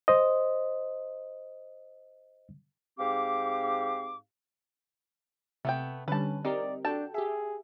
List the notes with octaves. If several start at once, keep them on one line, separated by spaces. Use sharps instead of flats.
C5 D#5
G#2 C4 G4 F5 D6
C3 A3 B3 G5
D3 G3 C#4 B4 A5
C4 D#4 G4 A#4 D5
D4 F#4 A4 G5 A5
G4 G#4 E5